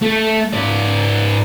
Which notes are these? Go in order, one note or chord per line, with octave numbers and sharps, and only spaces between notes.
A3
G#2 D5